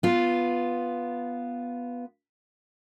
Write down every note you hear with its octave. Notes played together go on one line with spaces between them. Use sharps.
B3 F4